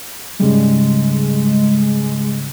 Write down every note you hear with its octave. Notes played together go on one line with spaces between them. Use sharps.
G#2 C#3 G3 G#3